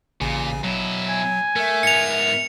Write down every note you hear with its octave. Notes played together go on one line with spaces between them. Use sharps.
A1 A#2 C#3 G#5
B2 F#3 E4
G#5
A3 A#4 E5
G#2 B3 C#7 F7